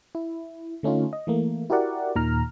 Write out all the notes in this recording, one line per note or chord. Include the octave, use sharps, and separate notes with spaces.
E4
D3 A3 C#4 D#4 F4
D#5
E3 A3 A#3
E4 F#4 G4 A#4 D5 F#5
D#2 A#2 D#3 A#5 F6